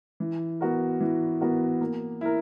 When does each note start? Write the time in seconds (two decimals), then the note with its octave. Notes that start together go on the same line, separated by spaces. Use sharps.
0.20 E3
0.61 B3 F#4 A#4
1.01 E3
1.41 B3 F#4 A#4
1.81 A#3
2.21 E4 A#4